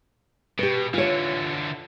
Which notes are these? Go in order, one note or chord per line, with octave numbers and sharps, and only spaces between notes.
B2 G4 B4
D3 E3 F4 C#5